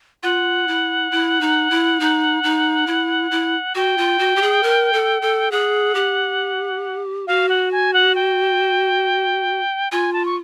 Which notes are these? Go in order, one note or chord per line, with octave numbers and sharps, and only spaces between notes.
F4 F#5
E4
E4
D#4
E4
D#4
D#4
E4
E4
F#4 G5
F4
F#4
G4
G#4
A#4
A4
A4
G#4 F#5
G4
F#4 F5
F#5
G#5
F#5
G5
F4 G#5
A5
C#6